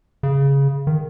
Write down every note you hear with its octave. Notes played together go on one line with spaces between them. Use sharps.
C#3
D#3